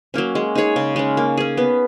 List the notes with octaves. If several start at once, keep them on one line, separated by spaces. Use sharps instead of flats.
F#3 A#3 C#4
G#3
D#4 G#4 C#5
C#3
G#3 C#4
A#3
C#4 G#4
B3